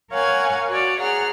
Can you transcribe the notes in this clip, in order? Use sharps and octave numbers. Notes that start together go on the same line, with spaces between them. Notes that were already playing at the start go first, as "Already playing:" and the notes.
A#4 C#5 F5 F#5 G#5
F#4 C#5 D5
G#4 F#5 A#5 F6